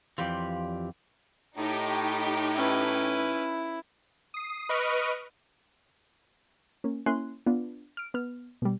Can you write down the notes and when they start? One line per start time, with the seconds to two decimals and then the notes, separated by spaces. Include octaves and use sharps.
0.18 F2 E3 F4 G4 D5
1.57 A2 D#4 G4
2.56 C#4 E4 B4
4.34 D#6 C7
4.69 B4 D#5 C#6 F6 D7 D#7
6.84 A#3 C#4
7.06 A#3 C#4 E4 G#5 C6 F#6
7.46 B3 D4 F4
7.97 F6 D7
8.14 B3 F6
8.62 B2 G3